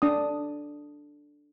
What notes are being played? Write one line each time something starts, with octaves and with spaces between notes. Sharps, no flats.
D4 D#6